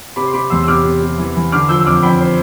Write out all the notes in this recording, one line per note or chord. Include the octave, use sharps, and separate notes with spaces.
C3 B5 D6
C6
C3 B5 D6
E2 C6 E6
E6
C3 D6 F6
C3
C3
E3
E3
D3 D6 F6
F3 E6 G6
E6
F2 D6 F6
F2 G5 B5
C5